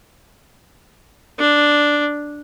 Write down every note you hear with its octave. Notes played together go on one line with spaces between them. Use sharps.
D4